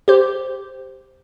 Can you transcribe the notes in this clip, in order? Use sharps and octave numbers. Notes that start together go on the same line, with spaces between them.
G4 C5